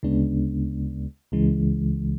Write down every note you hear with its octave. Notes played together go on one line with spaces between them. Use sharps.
D2 C#3 G#3 B3 D4
C#2 C#3 E3 G#3